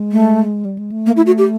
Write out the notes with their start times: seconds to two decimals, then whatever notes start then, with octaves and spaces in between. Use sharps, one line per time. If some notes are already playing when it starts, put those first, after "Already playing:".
Already playing: G#3
0.12 A3
0.65 G3
0.78 G#3
0.92 A3
1.06 A#3
1.17 E4
1.26 F#4
1.38 G4